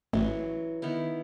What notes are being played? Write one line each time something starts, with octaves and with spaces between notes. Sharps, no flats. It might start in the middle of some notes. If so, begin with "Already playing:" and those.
A1 E3 F#3
D#3 B3 E4